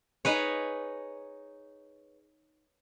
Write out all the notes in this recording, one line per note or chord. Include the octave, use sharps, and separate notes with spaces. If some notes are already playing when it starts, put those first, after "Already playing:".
D#4 G#4 B4 C#5